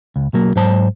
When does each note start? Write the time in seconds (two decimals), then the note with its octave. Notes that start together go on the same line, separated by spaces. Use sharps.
0.16 C#2
0.33 B1 F#3 A#3
0.56 G#2 F#3 C5 A5